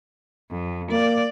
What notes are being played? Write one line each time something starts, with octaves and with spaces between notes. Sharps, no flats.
F2
A#3 D5